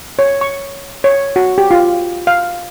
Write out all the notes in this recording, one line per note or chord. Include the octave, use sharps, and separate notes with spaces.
C#5
C#6
C#5
F#4
G4
F4
F5